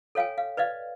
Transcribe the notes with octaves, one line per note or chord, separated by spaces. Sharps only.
A4 C#5 F5 G5 G#5
F5
B4 D5 D#5 F5